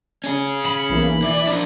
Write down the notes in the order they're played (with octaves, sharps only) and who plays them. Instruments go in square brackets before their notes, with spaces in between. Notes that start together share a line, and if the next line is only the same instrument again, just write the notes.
[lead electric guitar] C#4 G#4
[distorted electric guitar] B5
[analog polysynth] B1 E3 A#3
[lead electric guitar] E3 E4 [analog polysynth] D5
[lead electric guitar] F3 D4